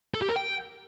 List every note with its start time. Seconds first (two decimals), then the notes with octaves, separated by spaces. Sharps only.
0.14 A4
0.21 G4
0.29 A#4
0.36 G5